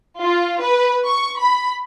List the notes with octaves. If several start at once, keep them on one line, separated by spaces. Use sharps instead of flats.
F4
B4
C#6
B5